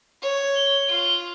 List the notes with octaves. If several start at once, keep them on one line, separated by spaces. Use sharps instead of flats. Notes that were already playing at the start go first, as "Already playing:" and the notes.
C#5
G7
F4